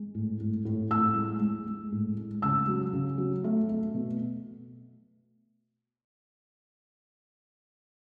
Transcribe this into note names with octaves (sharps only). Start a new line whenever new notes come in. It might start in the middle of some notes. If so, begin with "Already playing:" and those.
Already playing: G#3
A2
A2
A2
A2 E6
G#3
G#3
G#3
A2
G#3
C#3 E6
F#3
C#3
F#3
A3
A3
B2